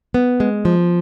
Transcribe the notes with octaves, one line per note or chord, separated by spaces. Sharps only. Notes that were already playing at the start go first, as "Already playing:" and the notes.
B3
G#3
F3